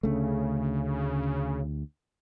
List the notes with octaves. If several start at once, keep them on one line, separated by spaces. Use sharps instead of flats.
D2 C#3 A3